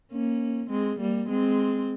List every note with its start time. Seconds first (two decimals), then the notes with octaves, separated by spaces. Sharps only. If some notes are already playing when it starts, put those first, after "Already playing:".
0.12 A#3 C#4
0.70 G#3 C4
0.99 G3 A#3
1.29 G#3 C4